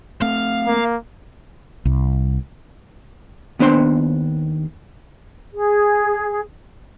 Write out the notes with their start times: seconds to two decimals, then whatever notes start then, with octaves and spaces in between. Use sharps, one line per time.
0.22 A3 C4 F5
0.67 A#3
1.85 C2
3.59 D#2 B3 D4 C5 C6
5.54 G#4